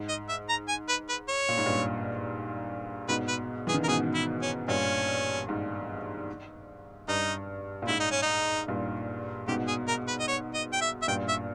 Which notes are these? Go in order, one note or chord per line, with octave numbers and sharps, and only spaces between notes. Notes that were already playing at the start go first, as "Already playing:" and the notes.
Already playing: G#2
D#5
E5
A#5
G#5
B4
B4
C#5
A#2
G#2
G2 A#2
G#2 B2 B4
B4
E3 G#4
D#3
C#3 A#4
G#2 B2 G#4
E4
C#4
G2 A#2 C#4
G#2
G2 D#4
A#2
G#2 E4
D#4
C#4
D#4
G2 A#2
G#2 B2 G4
G#4
A#4
B4
D#5
C#5
D#5
G5
E5
E5
G2 A#2 G5
E5